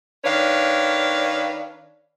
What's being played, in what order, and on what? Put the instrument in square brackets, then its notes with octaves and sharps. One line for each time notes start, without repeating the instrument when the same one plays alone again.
[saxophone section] D#3 D4 B4 C#5 F5